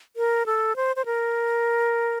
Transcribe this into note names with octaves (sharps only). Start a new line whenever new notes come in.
A#4
A4
C5
C5
A#4